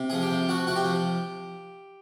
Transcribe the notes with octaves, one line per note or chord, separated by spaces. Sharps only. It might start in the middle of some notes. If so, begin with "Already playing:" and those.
Already playing: C3
F3 G#4
G4
C3
F3 F#4
C3 F#4
G4
F3